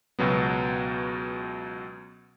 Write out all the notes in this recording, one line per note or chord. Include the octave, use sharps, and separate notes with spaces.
C#2 B2 F#3 B3